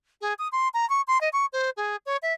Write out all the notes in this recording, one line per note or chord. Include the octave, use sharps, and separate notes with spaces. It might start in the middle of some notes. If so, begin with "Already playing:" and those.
G#4
D#6
C6
A#5
C#6
C6
D#5
C#6
C5
G#4
C#5
E5